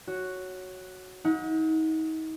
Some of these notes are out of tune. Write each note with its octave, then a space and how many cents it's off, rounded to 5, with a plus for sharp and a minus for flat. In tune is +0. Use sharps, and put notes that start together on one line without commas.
F#4 +0 C#5 +0
D#4 +35 F#5 -25